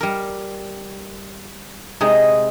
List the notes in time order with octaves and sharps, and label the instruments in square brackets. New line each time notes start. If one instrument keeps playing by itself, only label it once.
[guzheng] G3 A#4
C3 G#3 D#4